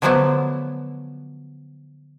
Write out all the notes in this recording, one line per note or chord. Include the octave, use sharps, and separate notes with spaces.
D3 F3 F#3 A3 B3 E4